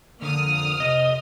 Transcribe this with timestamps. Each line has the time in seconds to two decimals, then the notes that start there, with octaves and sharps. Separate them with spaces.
0.22 F2 D3 A#3 D#6 F6
0.80 C3 D#5